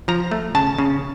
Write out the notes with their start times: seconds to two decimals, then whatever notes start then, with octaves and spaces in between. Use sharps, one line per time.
0.08 F3 A#5
0.31 A3
0.55 C#3 A5
0.78 C#3